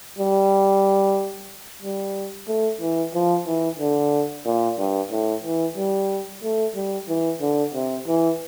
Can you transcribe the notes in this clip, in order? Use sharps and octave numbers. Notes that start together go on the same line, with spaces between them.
G3
G3
A3
E3
F3
E3
D3
A#2
G2
A2
E3
G3
A3
G3
E3
D3
C3
E3